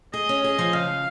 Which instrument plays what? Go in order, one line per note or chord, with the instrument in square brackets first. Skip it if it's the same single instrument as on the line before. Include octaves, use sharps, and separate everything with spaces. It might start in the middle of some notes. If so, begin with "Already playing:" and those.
[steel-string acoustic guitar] G#4 [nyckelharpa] D#5
[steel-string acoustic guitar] C#4
G#4
F3
[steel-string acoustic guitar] C#3 [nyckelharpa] F5